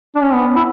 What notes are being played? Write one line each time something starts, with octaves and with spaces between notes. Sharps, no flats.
D4
C#4
B3
E4